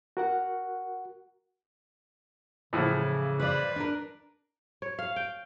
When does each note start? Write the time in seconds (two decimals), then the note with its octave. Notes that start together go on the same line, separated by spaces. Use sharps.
0.17 F#4 A#4 F#5
2.73 A2 C#3 E3 F3
3.39 B4 C5 D5
3.76 D4 A#4
4.82 C#5
4.99 F5
5.16 G5